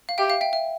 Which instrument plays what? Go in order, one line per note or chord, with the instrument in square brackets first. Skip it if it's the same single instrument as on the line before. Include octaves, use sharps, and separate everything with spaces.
[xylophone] F5
[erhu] G4 [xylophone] E5 G5
[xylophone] F5
E5 G5
E5